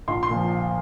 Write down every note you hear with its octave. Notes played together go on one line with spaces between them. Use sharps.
A#1 C6
C6
A#2 F3